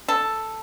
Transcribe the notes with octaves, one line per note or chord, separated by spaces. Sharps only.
A4